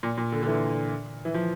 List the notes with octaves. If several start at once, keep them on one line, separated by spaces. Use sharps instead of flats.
A#2
A#2
D3
D3
E3
E3
F3